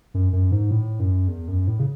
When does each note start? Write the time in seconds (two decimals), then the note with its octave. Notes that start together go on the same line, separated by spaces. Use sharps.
0.14 F#2
0.33 F#2
0.51 G#2
0.71 A2
1.00 F#2
1.28 E2
1.48 F#2
1.67 A2
1.80 C#3